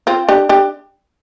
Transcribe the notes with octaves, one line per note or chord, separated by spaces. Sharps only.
C4 F4
D4 G4
D4 G4